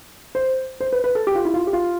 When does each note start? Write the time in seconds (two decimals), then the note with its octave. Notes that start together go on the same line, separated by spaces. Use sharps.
0.35 C5
0.80 C5
0.92 B4
1.04 B4
1.15 A4
1.27 G4
1.35 F4
1.45 E4
1.54 F4
1.67 G4
1.73 F4